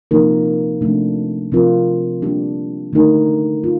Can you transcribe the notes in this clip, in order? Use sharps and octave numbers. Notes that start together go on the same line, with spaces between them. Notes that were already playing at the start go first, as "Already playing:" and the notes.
C3 F3 A#3 D#4 A#4
C3 F3 A3 D4
C3 F3 C4 F4 A#4
G3 A#3 D4 G4
D3 A3 D#4 A#4
F4